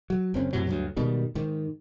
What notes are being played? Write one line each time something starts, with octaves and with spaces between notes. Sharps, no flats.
F#3
F#1 C4 C#4
F#2 A2 C3 F#3
D2 G2 F#3
G#2 B2 D#3 G3
G#2 D#3